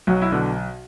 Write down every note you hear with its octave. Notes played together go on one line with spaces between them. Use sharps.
B1 F#3 F#4
E4
B2 D3 D4